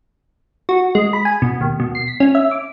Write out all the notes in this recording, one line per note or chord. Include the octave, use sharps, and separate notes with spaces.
F#4
G#3
B5
G#5
B2
D#2
B2
C7
B6
C#4
E5
D6